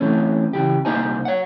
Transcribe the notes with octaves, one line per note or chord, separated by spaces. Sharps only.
E3 A3 C4 C#4
C#3 E3 G4
C2 A#3 D#4 C5 G#5
C#5 F#5